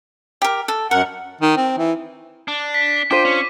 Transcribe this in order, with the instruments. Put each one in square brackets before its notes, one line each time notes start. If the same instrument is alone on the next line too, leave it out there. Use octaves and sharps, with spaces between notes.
[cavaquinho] G4 A#4
A4
[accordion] F#2 F#5 [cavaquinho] A#4
[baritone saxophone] D#3
C4
E3
[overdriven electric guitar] D4
[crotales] B6
[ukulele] D4 F4 C5 [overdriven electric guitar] G5 [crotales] D6 B6 D#7
[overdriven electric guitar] C#4